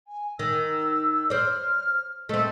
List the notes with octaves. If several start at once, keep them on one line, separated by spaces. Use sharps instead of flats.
G#5
D#3 E6
C5 D5 F6
A3 C4 D#5